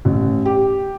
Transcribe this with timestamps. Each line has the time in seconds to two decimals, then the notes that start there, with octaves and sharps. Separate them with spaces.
0.05 A1
0.45 G4